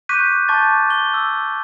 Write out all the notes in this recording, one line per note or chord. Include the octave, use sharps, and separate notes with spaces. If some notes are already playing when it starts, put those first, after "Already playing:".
C#6 D6 F#6 G6 B6 D#7
A5 C#6 D6 G6 A6
G7
E6